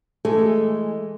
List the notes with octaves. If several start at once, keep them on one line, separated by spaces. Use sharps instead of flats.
E3 G#3 A3 G#4 A4